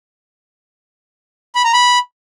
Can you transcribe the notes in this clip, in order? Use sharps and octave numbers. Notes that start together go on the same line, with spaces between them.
B5
A#5
B5